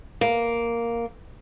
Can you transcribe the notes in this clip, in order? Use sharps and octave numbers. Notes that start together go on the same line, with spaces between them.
A#3